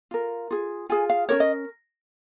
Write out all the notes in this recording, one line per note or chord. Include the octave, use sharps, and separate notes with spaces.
F4 A#4
F4 G#4
F4 G#4 G#5
F5
C#4 F#4 A#4 C#5
D#5